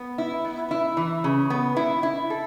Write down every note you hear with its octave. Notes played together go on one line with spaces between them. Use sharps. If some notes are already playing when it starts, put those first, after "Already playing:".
Already playing: B3
E4
B3
E4
E3
C#3
B3
E4
E4
A4